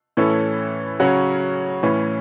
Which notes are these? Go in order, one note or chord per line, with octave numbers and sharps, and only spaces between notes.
A2 E3 C#4 A4
C#3 F#3 C#4 F#4
A2 E3 C#4